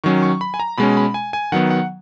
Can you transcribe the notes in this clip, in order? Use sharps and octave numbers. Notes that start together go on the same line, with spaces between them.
D#3 F#3 C#4 C#6
C#6
B5
G#5
A#5
B2 G#3 C#4 B5
B5
G#5
G#5
D#3 F#3 B3 F#5
F#5